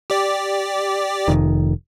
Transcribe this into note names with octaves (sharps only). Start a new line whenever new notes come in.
G4 D5
F1 D#3